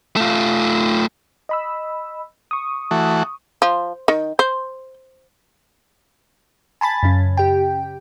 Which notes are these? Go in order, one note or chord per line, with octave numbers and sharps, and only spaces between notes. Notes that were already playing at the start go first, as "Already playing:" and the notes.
A3 F4
D#5 B5 E6
C#6 D#6
E3 A3 F#4
F3
D#3
C5
G#5 A5 B5 A6
F#2 C#3 C#4
G4 G5